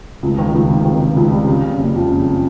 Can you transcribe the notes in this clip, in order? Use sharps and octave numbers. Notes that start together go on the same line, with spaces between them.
C#2
D#3
C#2
C3
D#3
C3
C#2
G3
C#3
C#3
F#1
F2
C#3